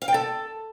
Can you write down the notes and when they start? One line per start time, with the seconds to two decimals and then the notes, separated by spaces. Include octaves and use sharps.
0.02 F5
0.08 G5
0.14 A4